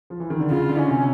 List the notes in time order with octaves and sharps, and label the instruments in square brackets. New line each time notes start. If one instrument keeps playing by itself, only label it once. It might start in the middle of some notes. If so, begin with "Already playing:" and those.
[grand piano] F3
E3
D#3
D3
[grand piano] C#3 [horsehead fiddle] F4
[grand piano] D3
[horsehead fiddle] C#4
[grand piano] C3